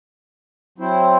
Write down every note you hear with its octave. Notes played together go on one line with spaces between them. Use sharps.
F#3 C4 E4 C5